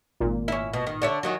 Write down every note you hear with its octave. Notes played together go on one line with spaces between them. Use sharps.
G#1 A#2
C#4 E4
B2
D#3
D3 C#5 E5
E2 D#3 F#3